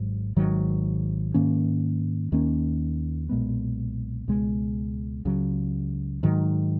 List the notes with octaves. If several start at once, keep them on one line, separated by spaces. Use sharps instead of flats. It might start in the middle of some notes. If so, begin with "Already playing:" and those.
Already playing: G#1 G#2 F#3
G#1 G#2 D#3 F#3
G#2 D#3 A#3 C#4
D#2 D#3 A#3 C#4
B1 A#2 G#3 B3
C#2 B2 G#3
C#2 C#3 F#3
G#2 D#3 F#3